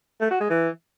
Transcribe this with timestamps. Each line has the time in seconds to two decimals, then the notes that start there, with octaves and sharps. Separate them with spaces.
0.21 A3
0.30 F#4
0.40 G#3
0.50 E3